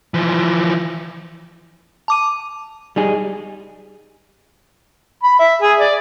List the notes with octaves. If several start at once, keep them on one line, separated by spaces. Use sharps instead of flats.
E3 F3
A5 D6 D#7
G3 D#4 G#4
B5
E5
G#4
D5